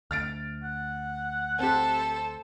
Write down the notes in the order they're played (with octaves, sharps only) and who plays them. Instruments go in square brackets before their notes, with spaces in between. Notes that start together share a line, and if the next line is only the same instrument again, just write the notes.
[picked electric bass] D2 [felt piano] F6 A6 D7
[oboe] F#5
[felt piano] C4 G4 [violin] A4 C5